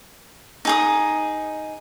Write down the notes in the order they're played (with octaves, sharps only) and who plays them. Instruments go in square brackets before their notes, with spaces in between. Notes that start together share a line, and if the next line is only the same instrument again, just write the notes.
[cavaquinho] D#4 G#4 D#6